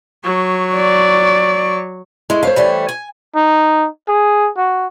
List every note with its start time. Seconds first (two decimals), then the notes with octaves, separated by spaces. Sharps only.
0.24 F#3 C#6
0.76 D5
2.30 G#3 A3 E4
2.43 A3 C5 C#5 F5
2.56 E3 G3 A3
2.89 G#5
3.35 D#4
4.08 G#4
4.57 F#4